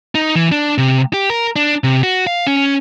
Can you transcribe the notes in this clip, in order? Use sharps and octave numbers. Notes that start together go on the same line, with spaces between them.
D#4
E3
D4
C3
G4
A#4
D4
C3
F#4
F5
C#4